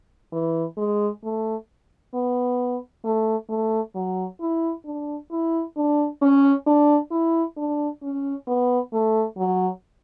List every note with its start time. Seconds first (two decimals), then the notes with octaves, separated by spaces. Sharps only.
0.32 E3
0.77 G#3
1.24 A3
2.14 B3
3.05 A3
3.49 A3
3.95 F#3
4.40 E4
4.85 D4
5.31 E4
5.76 D4
6.22 C#4
6.67 D4
7.11 E4
7.57 D4
8.03 C#4
8.47 B3
8.93 A3
9.37 F#3